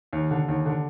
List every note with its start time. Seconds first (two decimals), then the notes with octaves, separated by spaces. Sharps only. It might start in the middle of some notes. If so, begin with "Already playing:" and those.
0.13 D#2
0.31 D3
0.48 D#2
0.66 D3